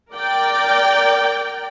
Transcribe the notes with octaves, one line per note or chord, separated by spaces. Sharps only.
A#4 D5 G5